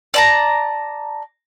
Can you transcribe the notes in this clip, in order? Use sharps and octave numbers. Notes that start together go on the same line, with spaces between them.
D5 A5 A#5